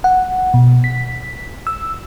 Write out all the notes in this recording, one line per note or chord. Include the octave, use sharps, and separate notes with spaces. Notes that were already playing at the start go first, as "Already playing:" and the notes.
F#5
B2
B6
E6